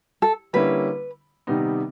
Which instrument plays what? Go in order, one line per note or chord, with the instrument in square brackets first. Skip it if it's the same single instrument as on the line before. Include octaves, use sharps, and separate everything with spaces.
[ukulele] A4
[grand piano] D3 G3 A#3 C#4 E4 [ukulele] B4
[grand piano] C3 D#3 G3 B3 D#4